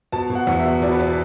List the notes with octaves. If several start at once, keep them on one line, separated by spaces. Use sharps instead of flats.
B2 A5
B2
F#5
E2
E5
B2
B2 D5
B4
B3 D5